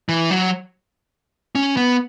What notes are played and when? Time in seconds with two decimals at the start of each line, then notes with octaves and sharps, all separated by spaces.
0.09 E3
0.31 F#3
1.55 C#4
1.77 B3